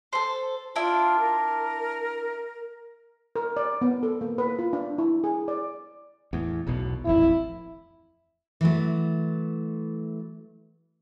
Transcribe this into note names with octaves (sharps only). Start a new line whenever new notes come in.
A4 C5
D4 E4 F4
A#4
A#4
D5
B3
A4
A#3
B4
F4
D4
E4
G#4
D5
E2 A2
E1 B1 B2
D#1 A1 F2 E4
E3 F#3 A3